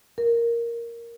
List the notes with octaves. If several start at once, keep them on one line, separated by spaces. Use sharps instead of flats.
A#4